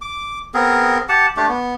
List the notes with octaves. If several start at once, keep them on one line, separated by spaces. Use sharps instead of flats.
D6
B3 C4 G#4 A#4
G4 F#5 A5
A3 D4 G4
B3